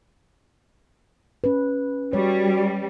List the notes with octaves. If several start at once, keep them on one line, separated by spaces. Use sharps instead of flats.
C#4 B4
G3 F#4 C#5